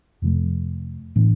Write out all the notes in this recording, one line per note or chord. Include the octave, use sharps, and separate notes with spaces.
F2 C3 F3 A3
A2 E3 B3 D4